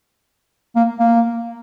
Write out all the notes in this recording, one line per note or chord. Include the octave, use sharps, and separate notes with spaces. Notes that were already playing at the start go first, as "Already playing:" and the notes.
A#3
A#3